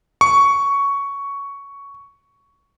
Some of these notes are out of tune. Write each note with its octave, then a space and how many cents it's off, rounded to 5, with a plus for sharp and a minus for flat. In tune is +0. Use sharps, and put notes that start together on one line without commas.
C#6 +10